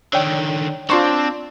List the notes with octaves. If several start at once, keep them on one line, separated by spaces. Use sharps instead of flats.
D3 D#3 C#5 D5 G5
C4 D4 F4 C6 C#6